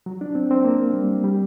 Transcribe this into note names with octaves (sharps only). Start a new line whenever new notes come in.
F#3
D4
C4
C4
A#3
G3
G3